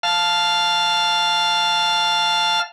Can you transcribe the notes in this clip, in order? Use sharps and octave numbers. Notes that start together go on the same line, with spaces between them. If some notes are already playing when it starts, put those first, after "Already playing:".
F5 A5 F6